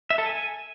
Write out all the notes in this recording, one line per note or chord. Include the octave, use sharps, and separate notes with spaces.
E5
A4
G#5